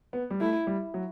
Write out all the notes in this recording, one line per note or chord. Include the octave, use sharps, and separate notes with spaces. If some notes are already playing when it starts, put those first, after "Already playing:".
B3
G3
A3 E4
G3
F#3